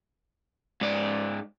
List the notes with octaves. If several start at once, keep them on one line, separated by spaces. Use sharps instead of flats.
G#2 D5